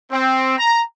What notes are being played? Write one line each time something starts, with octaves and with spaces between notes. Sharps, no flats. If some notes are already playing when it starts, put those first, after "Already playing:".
C4
A#5